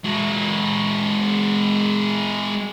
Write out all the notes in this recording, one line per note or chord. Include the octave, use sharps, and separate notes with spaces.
G#3 F#4